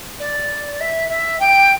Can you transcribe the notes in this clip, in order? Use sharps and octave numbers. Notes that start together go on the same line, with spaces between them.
D5
E5
E5
G5